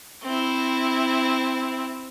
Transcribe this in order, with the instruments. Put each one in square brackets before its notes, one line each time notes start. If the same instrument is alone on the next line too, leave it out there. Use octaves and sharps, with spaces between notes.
[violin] C4 E4